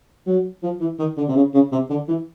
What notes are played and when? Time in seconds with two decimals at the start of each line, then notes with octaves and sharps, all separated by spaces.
0.26 F#3
0.63 F3
0.80 E3
0.99 D#3
1.17 D3
1.28 C3
1.36 C#3
1.54 C#3
1.72 C3
1.90 D3
2.08 E3